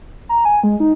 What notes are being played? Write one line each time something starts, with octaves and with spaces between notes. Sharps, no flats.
A#5
G#5
G#3
D#4